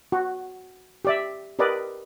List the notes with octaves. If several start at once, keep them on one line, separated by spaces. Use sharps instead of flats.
F#4
G4 D5 E5
G4 A#4 B4 D5 D#5